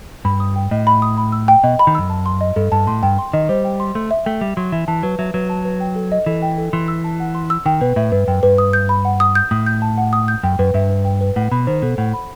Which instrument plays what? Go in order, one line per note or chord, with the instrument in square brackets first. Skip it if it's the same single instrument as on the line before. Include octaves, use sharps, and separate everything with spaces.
[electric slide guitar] G2 [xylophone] B5
[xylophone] D#6
G5
[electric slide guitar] A2 [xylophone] D#5
[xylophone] B5
D#6
B5
E6
G5
[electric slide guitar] B2 [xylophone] D#5
[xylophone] B5
[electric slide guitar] D#3
[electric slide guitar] F#2 [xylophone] E6
[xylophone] A5
C6
D#5
[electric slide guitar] G2 [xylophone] A4
[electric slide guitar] G2 [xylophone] A5
[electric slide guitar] A2 [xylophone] C6
[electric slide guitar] G2 [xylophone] G5
[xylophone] C6
[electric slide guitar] D#3 [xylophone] D#5
[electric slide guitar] G3 [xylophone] C5
[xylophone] G5
C6
[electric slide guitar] A3 [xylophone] C6
[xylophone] E5
[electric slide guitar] A3 [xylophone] G5
[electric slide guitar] G3 [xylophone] E5
[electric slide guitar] F#3 [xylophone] C6
[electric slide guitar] E3 [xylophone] E5
[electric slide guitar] E3 [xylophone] A5
[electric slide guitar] F#3 [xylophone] B4
[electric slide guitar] F#3 [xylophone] E5
[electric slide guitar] F#3 [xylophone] B4
[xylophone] A5
B4
G5
A4
D#5
[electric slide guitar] E3 [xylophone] A4
[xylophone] G5
A4
[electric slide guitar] E3 [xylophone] C6
[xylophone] E6
A5
F#5
C6
E6
[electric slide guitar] D#3 [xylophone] G5
[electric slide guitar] B2 [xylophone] B4
[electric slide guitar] A2 [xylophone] E5
[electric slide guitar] G2 [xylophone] B4
[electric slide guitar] F#2 [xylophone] G5
[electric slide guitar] G2 [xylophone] B4
[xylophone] D#6
G6
B5
F#5
D#6
G6
[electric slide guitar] A2 [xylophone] D#6
[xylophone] G6
A5
F#5
D#6
G6
[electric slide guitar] F#2 [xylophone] G5
[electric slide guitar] F#2 [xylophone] B4
[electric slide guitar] G2 [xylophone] E5
[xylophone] B4
G5
B4
[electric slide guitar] A2 [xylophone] F#5
[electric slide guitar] B2 [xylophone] B5
[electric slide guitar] D#3 [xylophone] C5
[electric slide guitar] B2 [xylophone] A4
[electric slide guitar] A2 [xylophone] F#5
[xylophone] B5